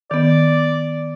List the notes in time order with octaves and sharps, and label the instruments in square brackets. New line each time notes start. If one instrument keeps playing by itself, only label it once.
[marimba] D#3 B3 [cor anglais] D5